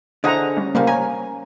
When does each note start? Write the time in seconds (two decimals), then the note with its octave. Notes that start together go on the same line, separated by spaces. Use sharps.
0.24 D3 E4 G#4 C5 D#5 F#5 A#5
0.57 G3 C#4
0.75 A2 C#3 G3 A#3 A#4 C5 F5
0.87 C#5 G#5 A#5